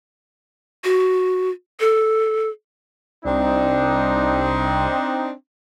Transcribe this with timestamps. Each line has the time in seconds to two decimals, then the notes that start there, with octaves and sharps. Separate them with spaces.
0.84 F#4
1.80 A4
3.24 C2 C4 D4 D#4